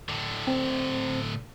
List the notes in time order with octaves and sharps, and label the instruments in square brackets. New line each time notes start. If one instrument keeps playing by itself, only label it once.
[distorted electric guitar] A2 D3
[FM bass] C4